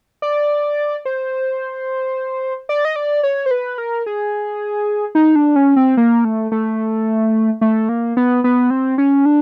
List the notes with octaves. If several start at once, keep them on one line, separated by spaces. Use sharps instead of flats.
D5
C5
D5
D#5
D5
C#5
C5
B4
A#4
G#4
D#4
D4
C#4
C4
A#3
A3
A3
A3
A#3
B3
B3
C4
C#4
D4